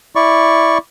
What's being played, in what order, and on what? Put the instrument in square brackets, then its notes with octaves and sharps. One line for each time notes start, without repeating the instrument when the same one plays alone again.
[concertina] E4 D5 C#6